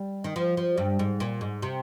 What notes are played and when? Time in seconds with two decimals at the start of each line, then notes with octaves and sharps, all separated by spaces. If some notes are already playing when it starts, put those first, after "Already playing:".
Already playing: G3
0.24 D#3
0.36 F3
0.57 F3
0.78 G2
0.99 G#2
1.20 A#2
1.41 G#2
1.62 C3